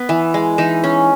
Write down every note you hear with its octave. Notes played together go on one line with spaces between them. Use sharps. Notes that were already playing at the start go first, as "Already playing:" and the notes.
Already playing: B3
E3
G#3
E3 D#4
C#4